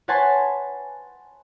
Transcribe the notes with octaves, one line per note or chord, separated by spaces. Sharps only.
B4 C#5 F#5 G#5 A5 C6